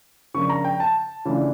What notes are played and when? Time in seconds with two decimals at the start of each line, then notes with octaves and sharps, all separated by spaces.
0.34 C#3 F3 A#3 D4 F4 C#6
0.49 A#5
0.65 G5
0.80 A5
1.25 C#3 E3 A3 D4 F4